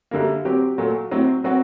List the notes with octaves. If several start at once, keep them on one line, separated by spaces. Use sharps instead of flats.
F#2 D3 G3 A#3
F#3 C4 G4
A#2 F#3 A3
A2 F#3 C4
F#3 C4 F#4